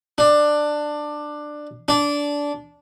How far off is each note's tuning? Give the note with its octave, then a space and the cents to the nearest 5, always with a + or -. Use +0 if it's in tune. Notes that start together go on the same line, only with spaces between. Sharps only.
D4 +15
D4 -15